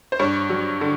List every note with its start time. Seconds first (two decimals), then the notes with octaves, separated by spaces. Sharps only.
0.12 C5
0.19 G2 C#5
0.50 F#3
0.81 D3